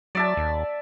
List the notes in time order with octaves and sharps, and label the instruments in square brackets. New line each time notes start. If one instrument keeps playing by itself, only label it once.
[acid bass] F#3 [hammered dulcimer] D5 E5 A5
[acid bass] D#2